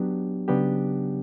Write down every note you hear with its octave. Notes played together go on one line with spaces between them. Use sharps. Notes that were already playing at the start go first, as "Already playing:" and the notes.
Already playing: F#3 B3 D4 G4
C#3 F#3 B3 D4 G4